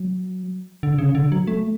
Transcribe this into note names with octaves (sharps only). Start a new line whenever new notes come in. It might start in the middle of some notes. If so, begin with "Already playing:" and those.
Already playing: F#3
D3
C#3
D3
F#3
A3